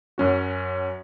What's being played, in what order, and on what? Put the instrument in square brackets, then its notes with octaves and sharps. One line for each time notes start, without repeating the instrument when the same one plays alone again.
[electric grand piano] F#2 C#4 F#4